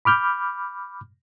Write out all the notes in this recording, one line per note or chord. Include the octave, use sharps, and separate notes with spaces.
B5 D6 F6 G6